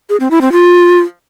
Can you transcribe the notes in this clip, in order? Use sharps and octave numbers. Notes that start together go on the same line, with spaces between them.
G#4
C4
E4
C4
F4